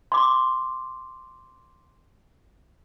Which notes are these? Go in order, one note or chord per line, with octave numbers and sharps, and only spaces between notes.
C6 D6